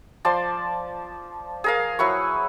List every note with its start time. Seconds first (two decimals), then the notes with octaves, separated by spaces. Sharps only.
0.25 F3 D5 A5 C6
1.64 G#4 A#4 F5
1.99 F#3 E4 B4 C#6